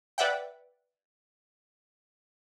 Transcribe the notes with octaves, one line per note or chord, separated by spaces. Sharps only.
B4 D5 E5 F#5 G5